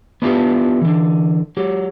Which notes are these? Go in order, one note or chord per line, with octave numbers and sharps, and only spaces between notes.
B3 D4 E4 F4 G4 B4
D3 E3
F#3 G4